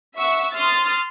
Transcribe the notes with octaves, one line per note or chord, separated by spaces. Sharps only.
E5 F#5 C#6 E6
C6 D#6 F6 A6